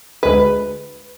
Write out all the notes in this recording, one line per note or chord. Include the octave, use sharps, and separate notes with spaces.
D2 G#3 B4